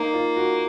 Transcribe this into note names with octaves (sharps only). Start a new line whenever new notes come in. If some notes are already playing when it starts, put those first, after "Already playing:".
Already playing: A#3 D#4
F4
F#4